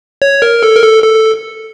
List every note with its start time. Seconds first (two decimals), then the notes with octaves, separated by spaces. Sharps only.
0.22 C#5
0.42 A#4
0.63 A4
0.75 A#4
0.83 A4
1.03 A4